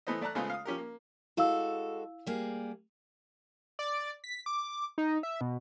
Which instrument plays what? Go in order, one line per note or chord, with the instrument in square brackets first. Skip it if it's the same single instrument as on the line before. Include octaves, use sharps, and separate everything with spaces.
[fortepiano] E3 A3 B3 C5 D#5
A3 D5 A5 A#5 F#6
C#3 G#3 A3 B3 F4 C5
F5 D#6
F3 C#4 G4 A#4
A#3
[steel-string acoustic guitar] G#3 F#4 A4 [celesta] E4 F5 E6
[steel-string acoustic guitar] G3 A#3 G#4
[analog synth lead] D5
B6
D6
D#4
E5
B2